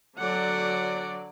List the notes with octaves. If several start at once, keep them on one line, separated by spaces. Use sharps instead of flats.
D3 F#3 D5 F#5